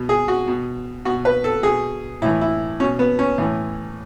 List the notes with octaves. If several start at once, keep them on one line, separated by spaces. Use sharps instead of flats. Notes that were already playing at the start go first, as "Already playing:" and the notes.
Already playing: B2
G#4
F#4
B2
B2 F#4
B4
A4
B2 G#4
A2 E3 E4
E4
B2 C#4
B3
C#4
A2 E3